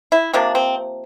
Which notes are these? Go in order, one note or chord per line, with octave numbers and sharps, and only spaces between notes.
E4
C3 F3 A#3 D4
C4